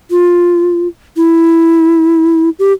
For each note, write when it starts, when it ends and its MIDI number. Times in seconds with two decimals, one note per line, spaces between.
0.11 0.88 65
1.17 2.49 64
2.59 2.72 67